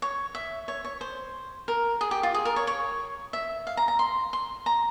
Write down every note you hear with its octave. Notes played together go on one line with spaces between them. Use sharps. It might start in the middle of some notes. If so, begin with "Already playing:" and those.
C#5
E5
C#5
C#5
C5
A#4
G#4
G4
F4
G#4
A#4
C#5
C#5
E5
F5
A#5
A#5
C6
C6
A#5